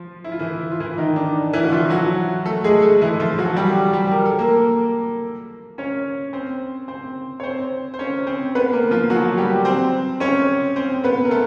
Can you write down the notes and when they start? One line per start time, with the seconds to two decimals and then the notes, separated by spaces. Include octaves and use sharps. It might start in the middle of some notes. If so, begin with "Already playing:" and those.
Already playing: F3 F4
0.24 E4
0.32 F4
0.39 E3 E4
0.72 F4
0.80 E3 E4
0.98 D#3 D#4
1.16 D4
1.53 E3 E4
1.63 F#4
1.72 F3 F4
1.90 F#3 F#4
2.45 A3 A4
2.64 G#3 G#4
2.82 A3 A4
3.01 E3 E4
3.20 F3 F4
3.38 F#3 F#4
3.57 G3 G4
3.93 G3 G4
4.11 A#4
4.26 A4
4.39 A#3 A#4
5.78 C#4 C#5
6.33 C4 C5
6.88 C4 C5
7.40 C#5
7.43 C4 C5
7.94 C5
7.99 C#4 C#5
8.27 C4 C5
8.55 B3 B4
8.73 A#3 A#4
8.91 F3 F4
9.10 F#3 F#4
9.37 G3 G4
9.65 C4 C5
10.20 C#4 C#5
10.76 C4 C5
11.04 B3 B4
11.25 A#4
11.31 A3 A4